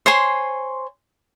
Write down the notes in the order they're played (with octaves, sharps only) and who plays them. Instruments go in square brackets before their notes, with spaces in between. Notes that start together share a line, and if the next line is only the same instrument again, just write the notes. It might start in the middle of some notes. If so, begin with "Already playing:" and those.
[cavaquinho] C5 C#5 G#5 C6